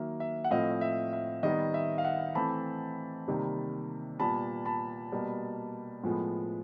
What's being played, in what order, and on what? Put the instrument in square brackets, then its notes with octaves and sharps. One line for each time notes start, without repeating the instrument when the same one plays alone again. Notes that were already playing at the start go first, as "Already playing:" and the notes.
Already playing: [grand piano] D#3 F#3 A#3 E5
E5
F#5
A2 F3 A3 C4 D#5 F5
D#5
E5
E5
D#3 G3 B3 D#5
E5
F5
E5 F#5
E3 A3 C4 A5 B5
C3 D#3 G3 A#3
A#2 G3 B3 A5 B5
A5 B5
B2 G3 A#3
A2 F3 G#3 B3